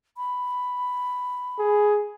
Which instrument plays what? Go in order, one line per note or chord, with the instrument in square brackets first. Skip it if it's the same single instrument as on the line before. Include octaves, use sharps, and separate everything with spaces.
[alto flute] B5
[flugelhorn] G#4